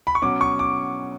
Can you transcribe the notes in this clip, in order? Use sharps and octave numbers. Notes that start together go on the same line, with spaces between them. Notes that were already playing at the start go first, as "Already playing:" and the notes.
B5
C#6
B2 F#3 C#4 D6
C#6
D6